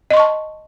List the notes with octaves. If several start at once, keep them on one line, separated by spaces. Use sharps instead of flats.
D#5 A5 C6 C#6